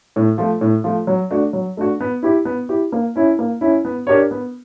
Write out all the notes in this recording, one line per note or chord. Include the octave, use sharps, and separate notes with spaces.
A2
F3 A3
A2
F3 A3
F#3
A3 D4 F#4
F#3
A3 D4 F#4
B3
E4 G4
B3
E4 G4
A#3
C#4 E4
A#3
C#4 E4
B3
D4 G4 A#4 C#5
B3